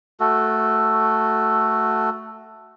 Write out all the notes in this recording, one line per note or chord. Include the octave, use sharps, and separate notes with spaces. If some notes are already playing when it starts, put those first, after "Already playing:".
A3 F#4 A4